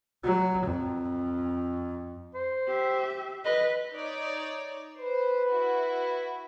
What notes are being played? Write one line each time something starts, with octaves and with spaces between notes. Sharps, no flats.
F#3
F2
C5
G4 E5
B4 D#5
D#4 C#5 D5
B4 C5
E4 F#4